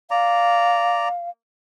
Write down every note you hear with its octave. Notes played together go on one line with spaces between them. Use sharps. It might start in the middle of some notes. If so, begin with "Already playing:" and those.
D5 F5 A#5